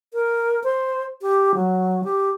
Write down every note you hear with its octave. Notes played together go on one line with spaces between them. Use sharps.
A#4
C5
G4
F#3
G4